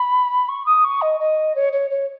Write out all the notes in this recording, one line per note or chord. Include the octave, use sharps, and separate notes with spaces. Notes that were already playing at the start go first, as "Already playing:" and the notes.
Already playing: B5
C#6
D#6
C#6
D#5
D#5
C#5
C#5
C#5